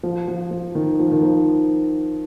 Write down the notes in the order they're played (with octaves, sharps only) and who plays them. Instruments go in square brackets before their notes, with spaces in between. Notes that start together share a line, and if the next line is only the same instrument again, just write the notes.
[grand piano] F3
F3
F3
D#3
F3
D#3
F3